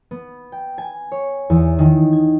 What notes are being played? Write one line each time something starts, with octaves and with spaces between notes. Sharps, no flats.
B3
G5
G#5
C#5
E2
D#3
G#6